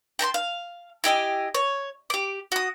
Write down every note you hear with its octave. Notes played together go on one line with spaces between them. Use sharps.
G5 A5 A#5 C6
F5
E4 G4 D#5 G#5
C#5
G4 D6
F#4 D#6